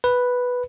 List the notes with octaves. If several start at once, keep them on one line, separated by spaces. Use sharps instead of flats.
B4